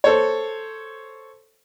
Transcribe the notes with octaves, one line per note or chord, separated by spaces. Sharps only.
A4 C5 C#5